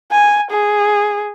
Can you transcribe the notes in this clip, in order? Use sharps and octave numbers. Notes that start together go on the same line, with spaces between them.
G#5
G#4